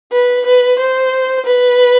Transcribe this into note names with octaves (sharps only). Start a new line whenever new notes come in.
B4
B4
C5
B4